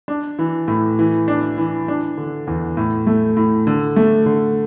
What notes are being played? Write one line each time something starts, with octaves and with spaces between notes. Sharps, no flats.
D4
E3
A2
E3
D4
E3
D4
D3
E2
A2
A3
A2
D3
A3
D3